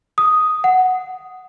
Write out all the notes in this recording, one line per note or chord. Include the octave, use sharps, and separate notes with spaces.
D#6
F#5